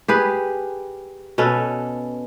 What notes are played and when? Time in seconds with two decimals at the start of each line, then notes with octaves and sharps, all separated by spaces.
0.08 G4 G#4 B4
1.38 B2 C#4 A4 B4